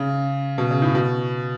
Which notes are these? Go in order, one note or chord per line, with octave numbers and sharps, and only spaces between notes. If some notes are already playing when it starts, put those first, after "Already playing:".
Already playing: C#3
B2
C#3
A2
B2